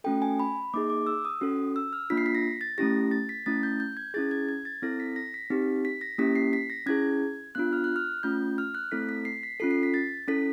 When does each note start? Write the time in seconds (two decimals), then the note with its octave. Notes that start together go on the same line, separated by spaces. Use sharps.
0.04 A3 C#4 F#4 A4 G5
0.22 G#5
0.40 B5
0.74 A#3 D#4 G#4 D6
0.90 D6
1.07 E6
1.25 D#6
1.41 C#4 F#4 A4
1.76 E6
1.93 F6
2.10 A#3 D4 F4 B6
2.17 C7
2.26 B6
2.35 A#6
2.61 A6
2.78 A3 C#4 E4 G4 A#6
3.11 A6
3.29 B6
3.46 A3 C#4 E4 A6
3.63 G6
3.80 G6
3.97 G#6
4.14 C#4 E4 G#4 A6
4.31 G#6
4.49 G#6
4.65 A6
4.82 C4 E4 A4 A#6
5.00 B6
5.16 A#6
5.34 B6
5.50 C4 D#4 G4
5.85 B6
6.01 A#6
6.18 A#3 C#4 E4 G4 B6
6.36 C7
6.53 B6
6.70 A#6
6.86 C#4 E4 G#4 G#6
7.55 B3 D4 F4 F#6
7.73 F6
7.84 F#6
7.96 F6
8.23 A3 C#4 F4 G6
8.58 F6
8.75 F#6
8.92 A3 C4 E4 A4 B6
9.09 B6
9.25 C7
9.43 B6
9.60 C#4 F4 A4 C7
9.71 C7
9.83 B6
9.94 A6
10.28 C#4 E4 A4 B6